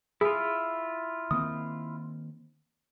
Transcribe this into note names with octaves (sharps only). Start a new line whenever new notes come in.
E4 F4 G#4
D#3 A#3 C4 D#6